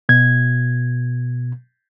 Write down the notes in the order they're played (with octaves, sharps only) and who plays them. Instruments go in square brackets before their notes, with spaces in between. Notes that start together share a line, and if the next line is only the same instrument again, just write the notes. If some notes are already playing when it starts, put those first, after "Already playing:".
[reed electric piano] B2 G#6